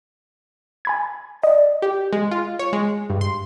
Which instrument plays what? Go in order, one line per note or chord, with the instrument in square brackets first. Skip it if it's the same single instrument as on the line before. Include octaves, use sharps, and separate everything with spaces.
[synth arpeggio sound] G#5 B5 G#6
[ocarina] D5 [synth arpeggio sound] D#5
[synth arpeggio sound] G4
G#3
F4
C#5
G#3
G2
C6